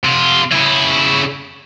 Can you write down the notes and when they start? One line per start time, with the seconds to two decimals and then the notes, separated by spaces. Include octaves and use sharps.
0.04 C3 F4
0.52 C#3 E4